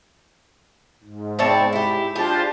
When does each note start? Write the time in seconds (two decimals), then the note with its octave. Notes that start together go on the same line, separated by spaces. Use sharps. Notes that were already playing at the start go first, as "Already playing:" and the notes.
1.03 G#2
1.39 C4 E4 C#5 D5 A5
1.73 E4 G4
2.16 D4 F4 G4 G#4 C5 A5